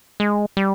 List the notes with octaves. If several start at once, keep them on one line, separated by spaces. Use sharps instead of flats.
G#3
G3